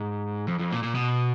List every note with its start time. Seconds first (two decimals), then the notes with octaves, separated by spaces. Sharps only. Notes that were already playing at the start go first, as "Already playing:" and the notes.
Already playing: G#2
0.48 F2
0.59 F2
0.72 A#2
0.83 A#2
0.95 B2